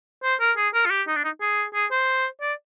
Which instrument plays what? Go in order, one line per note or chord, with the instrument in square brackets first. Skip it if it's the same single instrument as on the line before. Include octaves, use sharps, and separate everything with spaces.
[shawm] C5
A#4
G#4
A#4
F4
G4
D#4
D4
D#4
G#4
G#4
C5
D5